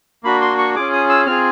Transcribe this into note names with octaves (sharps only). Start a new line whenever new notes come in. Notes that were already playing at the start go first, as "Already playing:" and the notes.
A#3 D4 F#4 B5
C6
C#6
C#4 F4 G#4 D6
D#6
E6
C4 F4 G#4 F6